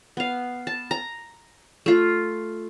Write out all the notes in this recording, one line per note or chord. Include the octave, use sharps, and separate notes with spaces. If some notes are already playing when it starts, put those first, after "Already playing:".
B3 F5
A5
A#5
A3 F4